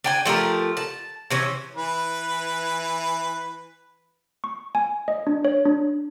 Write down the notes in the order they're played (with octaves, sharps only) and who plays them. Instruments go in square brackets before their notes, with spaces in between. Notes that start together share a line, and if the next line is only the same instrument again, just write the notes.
[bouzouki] D4 G5 G#5
F3 A3 G4 A#4
A5
C3 E3 C#4
[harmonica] E3 B4
[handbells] C#6
G#5
D#5
D4
C#5
D4